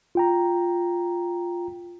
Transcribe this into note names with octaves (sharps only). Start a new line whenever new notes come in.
F4 G5 A#5